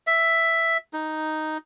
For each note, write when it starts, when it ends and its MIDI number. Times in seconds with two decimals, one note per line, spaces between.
0.07 0.77 76
0.93 1.57 63